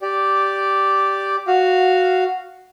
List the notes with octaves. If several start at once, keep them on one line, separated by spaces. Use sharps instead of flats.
G4 D5
F#4 F5